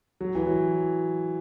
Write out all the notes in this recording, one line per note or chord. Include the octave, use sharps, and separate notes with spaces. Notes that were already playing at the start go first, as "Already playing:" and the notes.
F#3
E3
F#3